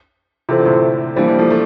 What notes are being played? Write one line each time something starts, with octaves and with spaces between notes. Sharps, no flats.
C3 E3 F4 A4 C5
D3
A2 C3
E3 G3 A#3 D4 G4 C5
E3 G3
F3 A3
A3